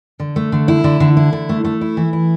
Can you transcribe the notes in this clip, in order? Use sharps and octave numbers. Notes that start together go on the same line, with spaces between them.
D3
A3
D3
E4
D3
D3
E4
D3
A3
A3
E4
E3
E4